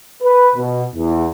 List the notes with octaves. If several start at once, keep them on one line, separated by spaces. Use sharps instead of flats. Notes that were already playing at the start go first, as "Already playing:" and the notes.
B4
B2
E2